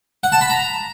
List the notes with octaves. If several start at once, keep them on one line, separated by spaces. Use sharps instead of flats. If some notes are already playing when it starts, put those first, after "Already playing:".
F#5
A5
B5
A#5